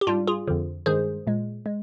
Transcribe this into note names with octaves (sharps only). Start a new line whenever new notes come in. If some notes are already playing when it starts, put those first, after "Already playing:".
G4
G#2 G3 D4 F4
F4 G#4
F2 D3 F3
G2 D#3 G#3 G#4 C5
A#2 G#3
G#3